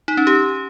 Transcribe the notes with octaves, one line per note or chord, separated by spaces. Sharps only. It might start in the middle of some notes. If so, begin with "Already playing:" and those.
D#4
C#4
G4